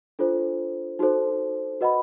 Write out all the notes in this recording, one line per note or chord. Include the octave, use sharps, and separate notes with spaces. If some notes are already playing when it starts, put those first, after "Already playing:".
D4 F4 A4 C5
D#4 F#4 A4 C5
F#4 B4 D#5 F#5 B5